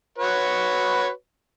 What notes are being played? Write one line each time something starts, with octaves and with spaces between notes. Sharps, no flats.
F#4 B4 C#5